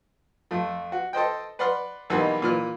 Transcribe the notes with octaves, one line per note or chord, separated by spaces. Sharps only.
F2 A3
F#4
A4 C5 D#5 G5
B4 D5 F#5 C6 F6
B1 B2 E3 G3 G#3 A#3
A#2 E3 F6